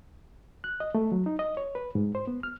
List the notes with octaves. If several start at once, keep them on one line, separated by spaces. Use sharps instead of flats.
F#6
D#5
A3
F#3
D#4
D#5
C#5
B4
G#2
C5
B3
F6